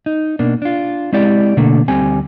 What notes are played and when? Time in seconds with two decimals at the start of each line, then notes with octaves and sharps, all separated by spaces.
0.06 D#4
0.39 B2 A#3 D4
0.62 D4 F4
1.13 G#3 C4 E4 G4 D5
1.57 B2 D3 A3 A#3 D4
1.88 D2 G3 C4 G#5